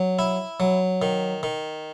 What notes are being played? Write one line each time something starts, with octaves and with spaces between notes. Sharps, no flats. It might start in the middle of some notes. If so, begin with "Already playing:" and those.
Already playing: F#3
E4
F#3
D#3
D#3